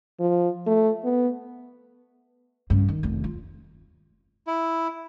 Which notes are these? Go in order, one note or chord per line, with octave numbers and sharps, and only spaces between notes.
F3
A3
B3
G2 C#3
D#3
F1 D#2
F4
E4